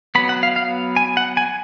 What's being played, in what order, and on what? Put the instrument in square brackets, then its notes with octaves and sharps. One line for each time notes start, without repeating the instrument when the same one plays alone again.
[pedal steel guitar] F#3 B3 B5
F#5
F5
F5
G#5
F#5
G#5